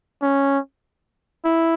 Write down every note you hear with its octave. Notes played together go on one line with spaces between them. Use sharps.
C#4
E4